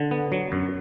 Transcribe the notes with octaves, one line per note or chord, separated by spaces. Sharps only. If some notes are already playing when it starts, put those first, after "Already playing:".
Already playing: D3
B3
F#3
F#2